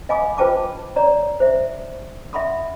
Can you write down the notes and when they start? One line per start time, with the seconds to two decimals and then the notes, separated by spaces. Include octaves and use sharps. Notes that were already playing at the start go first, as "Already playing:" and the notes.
0.09 D#5 F5 G#5 B5 D6 D#6
0.38 F4 B4 C5 G5 A5 D6
0.96 C#5 D5 A#5
1.40 C5 E5
2.33 E5 F#5 B5 C6 D#6